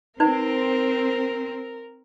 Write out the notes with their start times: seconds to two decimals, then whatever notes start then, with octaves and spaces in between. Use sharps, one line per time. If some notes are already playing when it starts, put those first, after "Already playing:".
0.20 C4 D#4 A#4 B4